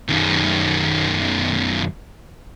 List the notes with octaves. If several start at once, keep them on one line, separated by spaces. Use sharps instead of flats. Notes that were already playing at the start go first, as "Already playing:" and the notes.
F#2 D#3